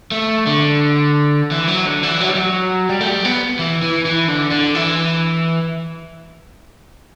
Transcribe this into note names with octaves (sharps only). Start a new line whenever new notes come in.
A3
D3
E3
F#3
D3
E3
F#3
G3
F#3
G3
A3
G3
B3
E3
E3
E3
D3
D3
E3